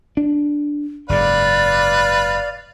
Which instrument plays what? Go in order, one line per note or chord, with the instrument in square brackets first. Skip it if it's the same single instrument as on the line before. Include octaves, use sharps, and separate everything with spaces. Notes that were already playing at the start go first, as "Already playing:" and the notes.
[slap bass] D4
[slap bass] F#1 G#2 C#3 [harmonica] B4 F5 [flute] D5